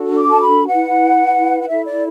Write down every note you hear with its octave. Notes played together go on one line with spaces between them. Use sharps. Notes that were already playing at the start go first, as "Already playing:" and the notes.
Already playing: D4 F#4 A4
D6
A5
B5
E4 B4 F#5
F#5
E4 A4 E5
D5